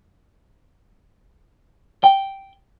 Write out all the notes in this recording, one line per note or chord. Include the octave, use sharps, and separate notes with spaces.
G5